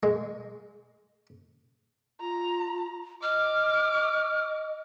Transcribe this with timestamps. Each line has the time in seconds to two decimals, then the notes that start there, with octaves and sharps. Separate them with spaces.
0.03 G#3
2.20 F4 A#5
3.23 D#5 D6 F6